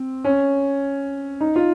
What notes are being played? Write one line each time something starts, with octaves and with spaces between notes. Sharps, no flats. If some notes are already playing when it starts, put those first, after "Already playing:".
Already playing: C4
C#4
D#4
F4